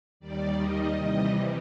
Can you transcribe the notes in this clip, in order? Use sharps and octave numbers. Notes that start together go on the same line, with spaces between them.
D#2 D#3 G3 D5
D#5
C3 E3 G3 D#5